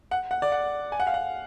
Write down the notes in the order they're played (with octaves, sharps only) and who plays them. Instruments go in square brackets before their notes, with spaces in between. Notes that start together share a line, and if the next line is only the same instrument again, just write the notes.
[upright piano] F#5
F#5
D5
F#5
G#5
F#5
F5
F#5